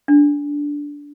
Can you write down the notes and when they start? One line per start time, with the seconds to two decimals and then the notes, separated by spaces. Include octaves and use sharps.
0.08 D4